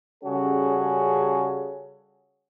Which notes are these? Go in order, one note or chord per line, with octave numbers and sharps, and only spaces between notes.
C#3 G3 C#4 F#4 G#4 A4